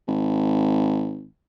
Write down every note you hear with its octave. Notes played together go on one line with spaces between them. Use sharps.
G#1